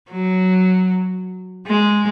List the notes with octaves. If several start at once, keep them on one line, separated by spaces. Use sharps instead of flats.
F#3
G#3